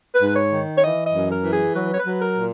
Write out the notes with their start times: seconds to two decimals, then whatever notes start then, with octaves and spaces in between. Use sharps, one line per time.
0.13 B4
0.21 G#2
0.36 C#5
0.52 D#3
0.76 C#5
0.82 E3 D#5
1.05 D#5
1.13 F#2
1.28 A#4
1.43 E3
1.51 G#4
1.74 F#3 B4
1.93 C#5
1.98 B4
2.05 F#3
2.20 A#4
2.36 A#2